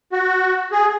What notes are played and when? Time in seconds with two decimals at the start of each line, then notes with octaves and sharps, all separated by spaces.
0.12 F#4
0.72 G#4